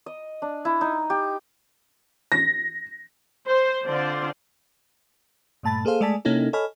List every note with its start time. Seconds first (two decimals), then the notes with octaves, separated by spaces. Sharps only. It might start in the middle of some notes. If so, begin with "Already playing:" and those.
0.06 D#5
0.42 D4
0.65 E4
0.81 D#4
1.10 G4
2.32 A#6
3.47 C5
3.85 D3 C4 F4 C5 D5
5.63 G2 A#2 A3 A5 B5 A6
5.85 A#3 G#4 A4 C5 F5
6.01 G#3 A3 D5 G#5 A5 B6
6.25 C3 A#3 C#4 D#4 E4 A4
6.53 A4 C#5 D#5 G#5 B5 F6